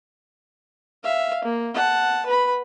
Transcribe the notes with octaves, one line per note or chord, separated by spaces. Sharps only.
E5 F5
A#3
F#5 A5
B4 B5